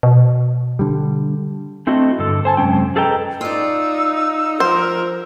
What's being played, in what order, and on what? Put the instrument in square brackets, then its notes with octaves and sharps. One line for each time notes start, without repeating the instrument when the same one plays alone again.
[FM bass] B2
[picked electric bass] D3 G3
[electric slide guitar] A3 C4 D4 E4 F#4 D#5
G2 D3 A4
C5 G#5 A5
F#2 C3 G#3 C#4 G5
G#4 A4 B4 D#5 G5 A#5
[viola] D#4 [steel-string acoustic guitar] F4 D5 [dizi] E6
[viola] F3 A#4 [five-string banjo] C5